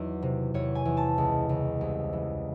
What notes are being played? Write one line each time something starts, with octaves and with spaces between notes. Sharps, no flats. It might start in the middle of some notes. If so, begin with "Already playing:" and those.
Already playing: E2 D#3 F#3
C3
E2 C#5
G#5
E2
A5
C#2
C#2
C2
E3